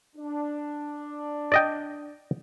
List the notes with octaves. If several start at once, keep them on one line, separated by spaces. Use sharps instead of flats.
D4
D5 D#5 G5